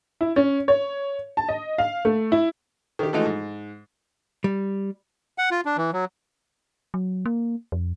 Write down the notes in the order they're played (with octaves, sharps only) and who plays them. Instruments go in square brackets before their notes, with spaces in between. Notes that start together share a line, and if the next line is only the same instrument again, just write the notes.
[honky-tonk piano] E4
C#4
C#5
A5
D#5
F5
A3
E4
[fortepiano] D#3 G4
E3 F3 G#3 A3 D#4 F#4
G#2
[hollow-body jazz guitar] G3
[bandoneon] F#5
F4
D4
E3
F#3
[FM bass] F#3
A#3
F2